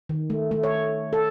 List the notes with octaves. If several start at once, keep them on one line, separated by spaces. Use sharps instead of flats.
D#3
A3
A3
C#5
A4